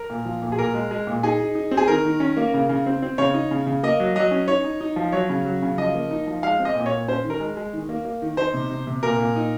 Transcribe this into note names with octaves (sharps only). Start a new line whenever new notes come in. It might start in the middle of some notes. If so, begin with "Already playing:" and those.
Already playing: A#4
A#2
F3
A#2
G#4
A#2 A#4
G#3
G#3
A#2
D#4 G#4
D#4
D#4
C4
G#4
D#3 A#4
D#3
C#4
A#3
C#3
C#3
C4
C4
C#3 C#5
D#4
C#3
C#3
A#3 D#5
F#3
F#3 D#5
C#4
D#4 C#5
D#4
D#4
F3
F#3 C#5
C#3
F#3
C#3
F3 D#5
A#3
D#4
F3
G#3 F5
C4
D#5
A#2
C#5
A#2
C#4 C5
D#3
A#4
G#3
G#3
D#3
A#3
A#3
D#3
D#4 C5
C3
C3
C3
A#2 A#4
A#2
D#4